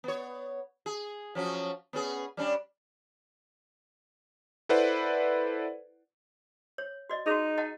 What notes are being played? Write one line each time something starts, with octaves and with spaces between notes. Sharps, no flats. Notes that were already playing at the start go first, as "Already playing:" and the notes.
B3 C#5
G#4
F3 F#3 C#4
B3 C#4 G#4
G3 C#4 D4
E4 A4 B4 C5 D5 F#5
C#5
F#4 D5 D#5
D#4 F#4 G#4
D#5 F#5 A5